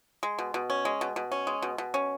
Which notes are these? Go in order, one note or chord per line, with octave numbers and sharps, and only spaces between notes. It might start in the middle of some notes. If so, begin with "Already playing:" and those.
G#3
B2
B2
C#4
G#3
B2
B2
C#4
G#3
B2
B2
C#4